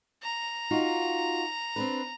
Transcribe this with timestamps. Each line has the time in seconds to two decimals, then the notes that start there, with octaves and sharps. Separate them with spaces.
0.23 A#5
0.71 D#4 F4 F#4
1.76 C4 D4 B4